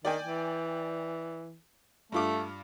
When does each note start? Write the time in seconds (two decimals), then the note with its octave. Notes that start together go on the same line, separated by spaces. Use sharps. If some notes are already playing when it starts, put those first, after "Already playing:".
0.05 D#3 D5 G5 G#5
0.24 E3
2.12 G2 A3 F4 D6